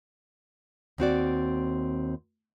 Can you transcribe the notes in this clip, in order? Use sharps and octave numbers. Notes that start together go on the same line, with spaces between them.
D#2 C4 F#4 D5